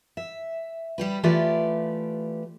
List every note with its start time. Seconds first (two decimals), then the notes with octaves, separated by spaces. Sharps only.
0.17 E5
0.98 G3 G4 B4
1.23 E3 A3 F4 G4 B4 D5